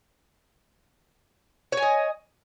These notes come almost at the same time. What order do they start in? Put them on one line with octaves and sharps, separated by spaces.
C#5 G#5 D#5